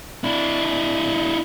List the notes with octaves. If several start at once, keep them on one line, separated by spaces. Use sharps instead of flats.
D4 E4